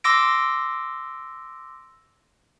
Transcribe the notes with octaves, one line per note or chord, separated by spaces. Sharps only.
C6 D6 E6 A#6 D7